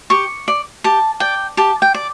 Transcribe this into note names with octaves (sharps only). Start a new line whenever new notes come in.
G4 C#6
D5
G4 A5
D5 G5
G4 A5
G5
D5